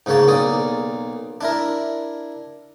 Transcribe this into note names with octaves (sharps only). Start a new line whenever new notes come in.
G#2 C#3 A#3 C#5 A5
B1 A#3 D5 D#6
D4 E4 A#4